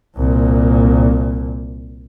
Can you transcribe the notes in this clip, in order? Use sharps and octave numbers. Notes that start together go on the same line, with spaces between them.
C2 A#2